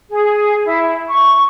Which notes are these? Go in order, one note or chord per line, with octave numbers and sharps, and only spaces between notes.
G#4
E4
C#6